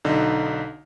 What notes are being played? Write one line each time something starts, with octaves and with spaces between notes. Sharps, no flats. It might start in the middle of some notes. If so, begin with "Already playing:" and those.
B1 D3 D#4